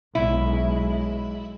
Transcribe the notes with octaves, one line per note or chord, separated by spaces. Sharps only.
B1 G#3 E4